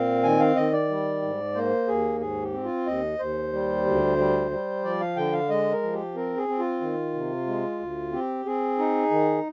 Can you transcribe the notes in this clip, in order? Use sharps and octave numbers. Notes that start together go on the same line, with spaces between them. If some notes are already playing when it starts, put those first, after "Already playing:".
Already playing: A#2 C4 F5
D#3 G#5
F5
D#3 D#5
D5
G3
G#2
A#3 C5
D#2 G#4
G#2 G#4
G4
C4
F4
D#2 D#5
D#2 C5
G3
D2
G3
G3
F3 D5
F5
D3 G5
F5
G#3 D#5
A#4
F3
G4
C4 A#4
G#4
C4
F4
D#3
C3
G#3
D2
C4 G4
C4 G#4
D#4
D#3